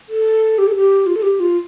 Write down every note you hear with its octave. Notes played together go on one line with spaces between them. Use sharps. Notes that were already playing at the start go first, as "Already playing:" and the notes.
A4
G4
A4
G4
F4
A4
G4
F4